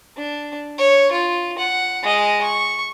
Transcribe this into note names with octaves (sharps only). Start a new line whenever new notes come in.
D4
C#5
F4
F#5
G#3 D#5
C#6